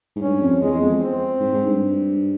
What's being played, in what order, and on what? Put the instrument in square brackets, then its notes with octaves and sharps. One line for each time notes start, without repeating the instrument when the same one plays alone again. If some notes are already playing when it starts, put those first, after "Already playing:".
[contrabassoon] G#2
[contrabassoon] G2 [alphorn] C#4
[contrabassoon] F2
[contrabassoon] E2 [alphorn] G#3
[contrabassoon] F2
[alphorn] C4
[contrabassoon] G#2
G#2
G2